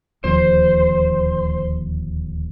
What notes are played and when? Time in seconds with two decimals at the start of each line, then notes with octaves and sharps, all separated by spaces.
0.24 D1 D#2 F3 C5